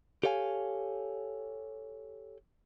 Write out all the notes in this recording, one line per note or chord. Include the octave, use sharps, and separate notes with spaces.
G4 A4 C#5 F5 G#5